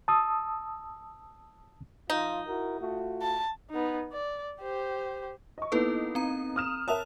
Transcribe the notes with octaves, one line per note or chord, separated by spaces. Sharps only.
A5 D#6 E6
F3 D#4 F4
E4 F#4 A#4
A3 F4 F#4
A5
B3 D#4
D5
G4 C5
D#5 C#6
A#3 B3 D#4 E4 A4 B4
C4 A#5
D#6 F6 E7
A#4 C#5 E5 A5 D#6 F7